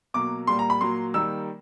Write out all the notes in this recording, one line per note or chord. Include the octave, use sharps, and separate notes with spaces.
B2 F#3 A#3 D6
A#2 G3 A#3 C6
A#5
B5
A#2 F#3 A#3 C6
D#3 G3 A#3 E6